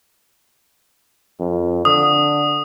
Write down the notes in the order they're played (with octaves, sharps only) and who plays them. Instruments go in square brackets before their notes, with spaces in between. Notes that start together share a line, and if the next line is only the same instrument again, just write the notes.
[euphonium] F2
[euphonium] D3 [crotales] D#6